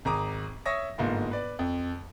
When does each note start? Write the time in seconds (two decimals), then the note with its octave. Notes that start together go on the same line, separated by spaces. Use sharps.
0.05 G#1 G#4 A#5 D6 D#6
0.66 C#5 E5 C#6 D#6 A#6
0.98 G1 G#2 A#3 F4
1.31 B4 D5
1.59 F2